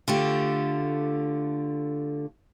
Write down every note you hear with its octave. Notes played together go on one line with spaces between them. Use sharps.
D3 A3 F4 G4